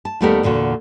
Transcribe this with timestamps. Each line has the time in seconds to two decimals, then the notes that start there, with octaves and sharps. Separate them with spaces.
0.05 A5
0.21 D#2 G3 A3 B3 G4 A#4
0.43 E2 A#2 D3 F#4